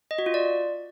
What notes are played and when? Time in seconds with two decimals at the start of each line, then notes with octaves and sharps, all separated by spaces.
0.11 D#5
0.18 F#4
0.26 F4
0.34 D5